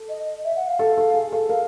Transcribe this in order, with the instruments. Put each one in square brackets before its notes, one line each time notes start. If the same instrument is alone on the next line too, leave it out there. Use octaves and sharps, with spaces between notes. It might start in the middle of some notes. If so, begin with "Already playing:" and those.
Already playing: [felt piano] A4
[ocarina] D#5
E5
F#5
F5
[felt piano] A4
A4
G#4
A4
[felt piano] A#4 [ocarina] F5